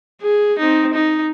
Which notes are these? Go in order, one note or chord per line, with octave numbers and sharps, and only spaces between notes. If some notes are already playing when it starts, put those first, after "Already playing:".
G#4
C4 D#4
D#4